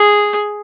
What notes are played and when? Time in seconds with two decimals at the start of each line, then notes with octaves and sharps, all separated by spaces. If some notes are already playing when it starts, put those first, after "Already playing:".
Already playing: G#4